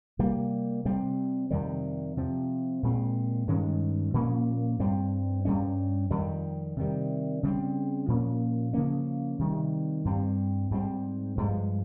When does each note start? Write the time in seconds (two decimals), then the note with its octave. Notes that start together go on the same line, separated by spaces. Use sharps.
0.19 C3 G3 A#3
0.85 C3 G3 C4
1.51 F2 C3 D#3 G3
2.17 C3 F3 C4
2.83 A#2 G#3 C4
3.47 G2 D#3 G#3 C#4
4.14 A#2 F3 A#3 C#4
4.80 G2 G3 C4
5.45 G2 G3 C#4
6.11 F2 D#3 G3
6.77 C3 D#3 G3
7.43 C#3 G3 C4
8.08 A#2 F3 A#3 C#4
8.73 C#3 F3 A#3 C#4
9.39 C3 D#3 G3
10.05 G2 G3 C4
10.71 G#2 G3 C4
11.37 G2 F3 G#3